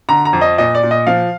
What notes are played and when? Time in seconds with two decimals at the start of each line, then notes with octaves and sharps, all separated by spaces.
0.09 D3 A#5
0.25 A#5
0.33 F2
0.41 D#5
0.58 A#2 D#5
0.75 D5
0.83 A#2
0.91 D#5
1.07 F3 F5